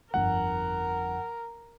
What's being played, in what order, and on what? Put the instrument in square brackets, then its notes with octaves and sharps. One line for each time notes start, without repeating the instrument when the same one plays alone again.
[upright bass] G1 F2 [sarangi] A#4 [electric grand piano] F#5